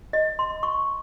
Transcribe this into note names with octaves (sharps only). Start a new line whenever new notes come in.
D#5
C6
C#6